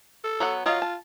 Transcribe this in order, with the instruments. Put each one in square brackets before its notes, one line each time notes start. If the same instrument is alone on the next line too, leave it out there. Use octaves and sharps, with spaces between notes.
[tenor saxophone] A4
[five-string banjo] F#3 B3 F#5
[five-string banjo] F#3 D#5 F5 [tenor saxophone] F4
[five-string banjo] A5